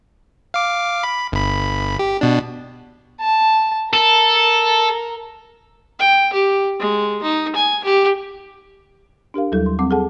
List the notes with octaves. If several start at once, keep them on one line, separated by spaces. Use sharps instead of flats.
F5 D6
B5
G1 B5
G4
B2 D4
A5
A4 A#4
G5
G4
G#3
D#4
G#5
G4
D4 G4 A#4 F5
D#2 F#3 G3 E4 A4 G6
C6
G3 C4 F#5 D6
G#4 A4 F#5 A5